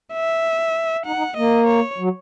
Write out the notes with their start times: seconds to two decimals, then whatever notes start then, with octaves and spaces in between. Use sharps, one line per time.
0.14 E5
1.06 D#4 F#5
1.16 D#4
1.37 A#3 D#5
1.67 C#5
1.98 F#3